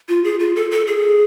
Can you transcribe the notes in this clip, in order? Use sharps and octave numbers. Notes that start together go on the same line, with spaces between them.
F4
G#4
F4
A4
A4
G#4